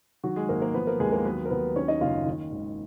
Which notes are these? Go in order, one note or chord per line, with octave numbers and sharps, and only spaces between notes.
D#3 F#3 F#4
G#3 G#4
G#1 A#3 A#4
A#3 A#4
F3 B3 B4
A#3 A#4
D#2 G#3 G#4
A#3 A#4
F#3 B3 B4
A#4
D#2 B3 B4
D#3 C#4 C#5
D#4 D#5
F#1 F4 F5
D#3
G#1